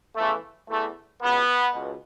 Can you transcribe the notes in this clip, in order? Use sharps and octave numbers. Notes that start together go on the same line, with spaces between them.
E2 C#3 E3 A3
E2 E3 A3
C#2 B2 B3
C#2 B2